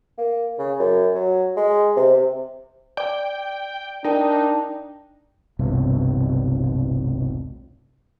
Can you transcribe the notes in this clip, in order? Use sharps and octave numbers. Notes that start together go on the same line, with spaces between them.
A#3
C#3
F#2
F#3
G#3
C3
C3
D5 G5 D6
D4 D#4 A#4 G5
D#1 B1 G2 C3